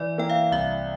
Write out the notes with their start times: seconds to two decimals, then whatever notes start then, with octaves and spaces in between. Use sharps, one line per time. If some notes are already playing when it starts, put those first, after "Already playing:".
Already playing: E3 D5
0.18 A#3 E4 G5
0.30 F5
0.51 C2 E5